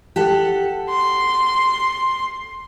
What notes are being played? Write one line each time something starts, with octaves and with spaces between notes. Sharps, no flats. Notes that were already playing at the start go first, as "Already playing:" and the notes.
G4 A4 F#5
C6